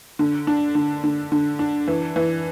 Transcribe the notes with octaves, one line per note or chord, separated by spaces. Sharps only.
D3
D4
D3
D3
D3
D4
E3
E3